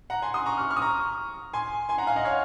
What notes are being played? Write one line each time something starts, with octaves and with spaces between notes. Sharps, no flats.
F#5 A#5
G#5 C6
C6 D#6
A#5 C#6
C#6 F6
C#6 F6
D#6
A#5 C#6
G#5 C6
G#5 C6
F#5 A#5
F5 G#5
D#5 F#5
C#5 F5